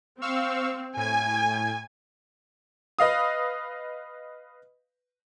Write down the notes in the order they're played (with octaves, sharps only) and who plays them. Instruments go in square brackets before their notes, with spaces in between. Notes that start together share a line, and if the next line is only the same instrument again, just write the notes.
[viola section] C4 [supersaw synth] F5 C#6 E6
[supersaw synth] A2 G#6 [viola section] G#5
[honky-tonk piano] B4 D#5 F5 D#6